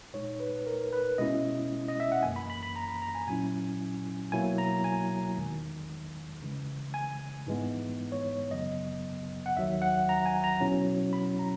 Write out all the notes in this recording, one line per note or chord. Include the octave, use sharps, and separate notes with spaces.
A#2 G#3 D#4 C#5
B4
A#4
B4
B2 G#3 C#4 E4 D#5
D#5
E5
F#5
F#2 E3 A#3 G#5
B5
B5
B5
A#5
B5
A#5
G#5
A#2 F#3 C#4 E4 G#5
B2 F#3 A#3 E4 G#5
A#5
G#5
E2 D#3 G#3
C#3 E3 G#3
G#5
G#2 E3 G#3 B3
C#5
F#2 C#3 F#3 B3 D#5
F#5
D#2 D#3 F#3 E5
F#5
A#5
G#5
A#5
B2 F#3 C#4 E4
B5
A#5